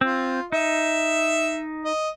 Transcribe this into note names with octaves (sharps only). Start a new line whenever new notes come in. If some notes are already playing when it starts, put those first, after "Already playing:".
C4 F4
D#4 E5
D#5